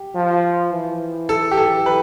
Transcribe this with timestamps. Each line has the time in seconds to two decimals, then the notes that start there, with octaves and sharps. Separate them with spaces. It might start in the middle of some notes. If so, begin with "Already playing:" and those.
Already playing: G4
0.15 F3
0.72 E3
1.29 A4
1.51 G4
1.57 A4
1.86 B4